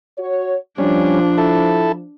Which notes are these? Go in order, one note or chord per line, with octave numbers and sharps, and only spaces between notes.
F#4 C#5
F3 G3 C#4 D4
E4 A4